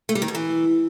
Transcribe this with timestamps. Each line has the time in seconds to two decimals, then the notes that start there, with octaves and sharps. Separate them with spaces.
0.09 A3
0.15 G3
0.22 D#3
0.28 B2
0.35 E3